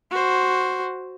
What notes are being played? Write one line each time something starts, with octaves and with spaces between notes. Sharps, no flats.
F#4 C5